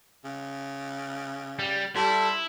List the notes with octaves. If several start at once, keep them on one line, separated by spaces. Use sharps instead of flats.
C#3
G3
G3 E4 A4 C6